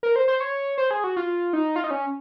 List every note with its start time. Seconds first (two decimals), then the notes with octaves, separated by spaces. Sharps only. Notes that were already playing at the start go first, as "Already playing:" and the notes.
0.03 A#4
0.16 C5
0.28 C5
0.41 C#5
0.78 C5
0.91 G#4
1.04 F#4
1.16 F4
1.53 D#4
1.76 F4
1.84 D#4
1.91 C#4